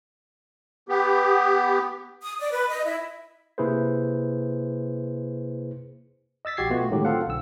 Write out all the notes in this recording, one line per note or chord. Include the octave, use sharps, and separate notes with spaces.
B3 G4
D#6
D5
B4
D#5
E4
C3 A#3 E4 G#4 B4 C5
D#5 E6 A6 B6
A#1 F#4 G4 G#6 C7
B2 A3 B3 F4 F#4
A2 D3 D#3 F#3 G#3 G4
C4 F4 A4 F5 F#5
B1 D3 E6